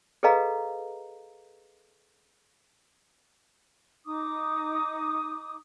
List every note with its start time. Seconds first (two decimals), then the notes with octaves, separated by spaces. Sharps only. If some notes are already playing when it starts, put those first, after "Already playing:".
0.23 G#4 A4 B4 D#5 F5 A#5
4.06 D#4 D6 D#6